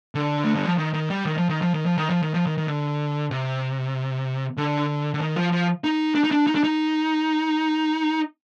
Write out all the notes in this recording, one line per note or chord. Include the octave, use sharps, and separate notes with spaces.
D3
A3
G3
F3
D#3
D#3
G3
D#3
F3
D#3
F3
D#3
F3
D#3
F3
D#3
F3
D#3
D#3
D3
C3
D3
D3
D#3
F3
F3
D#4
D4
D#4
D4
D#4
D4
D#4